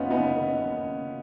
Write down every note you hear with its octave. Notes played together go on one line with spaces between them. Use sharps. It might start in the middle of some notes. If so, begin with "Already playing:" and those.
Already playing: F#1 F#2 D#3 B3 C#4 D#4 F4 B4
F#1 B3 D#4
D#3
F#1
F#1